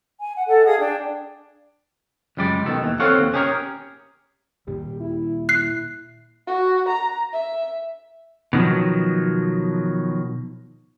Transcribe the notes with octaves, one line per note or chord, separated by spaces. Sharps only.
G#5
F#5
A4 D#5 F#5
G#4 F5 D#6
D4 G5
C#2 F#2 G3 G#3 D5
B2 D#3 A4
D#2 E3
C4 A4 C#5 F5 F#5
D#2
C#4 G4 G#4 A#4 C#5
A#2 D#3 G3 G4
E4
E4 F#6 C7
F#4
A#5
E5
B2 D#3 F3 F#3